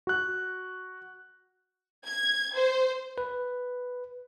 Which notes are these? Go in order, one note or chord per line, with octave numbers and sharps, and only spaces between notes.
F#4 F#6
G#6
C5
B4